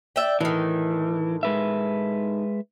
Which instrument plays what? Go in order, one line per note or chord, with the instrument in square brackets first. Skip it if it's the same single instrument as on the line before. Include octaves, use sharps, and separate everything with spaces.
[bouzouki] D5 E5 G5
[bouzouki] A2 D#3 [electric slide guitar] E3
[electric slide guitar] G#3 B4 E5